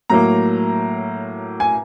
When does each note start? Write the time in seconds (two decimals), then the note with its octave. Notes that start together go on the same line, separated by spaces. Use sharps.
0.10 A2 F#3 A#3 A#5
1.60 G#5